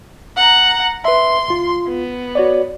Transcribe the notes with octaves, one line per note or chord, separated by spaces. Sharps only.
F#5 A#5
B4 E5 C6
C#2 F4
B3
F#4 C#5 D5